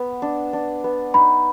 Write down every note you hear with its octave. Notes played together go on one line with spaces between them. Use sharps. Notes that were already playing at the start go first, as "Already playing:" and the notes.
Already playing: B3
D4
D4
B3
D#4 B5